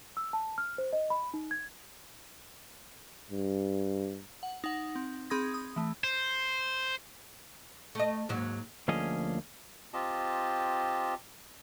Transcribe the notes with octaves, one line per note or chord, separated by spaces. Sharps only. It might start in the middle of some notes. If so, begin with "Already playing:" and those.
E6
A5
F6
C5
D#5
B5
D#4
G#6
G2
F#5
D#4 F#5
C4
C4 G#4 B5 D#6 G#6 A#6
D#6
E3 A3
C5
A3 D#5
D#2 G#2 F#3
D2 F3 A#3 C#4 G#4 D#5
C4 F4 G4 D#5 A5